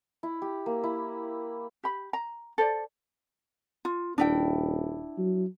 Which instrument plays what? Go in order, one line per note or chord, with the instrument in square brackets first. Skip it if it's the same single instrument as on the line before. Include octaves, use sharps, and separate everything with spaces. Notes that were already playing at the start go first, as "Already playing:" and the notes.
[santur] E4
G4
A#3
E4
[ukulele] G4 B5
A#5
A4 C5 D5
F4
[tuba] D#1 [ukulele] D4 E4 G5
[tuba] F#3